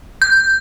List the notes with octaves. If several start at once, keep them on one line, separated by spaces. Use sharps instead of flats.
G6